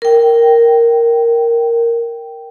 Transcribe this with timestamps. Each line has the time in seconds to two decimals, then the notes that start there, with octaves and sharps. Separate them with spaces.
0.02 A#4 G5